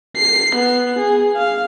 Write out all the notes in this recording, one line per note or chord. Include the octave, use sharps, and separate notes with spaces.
C7
B3
G#4
F5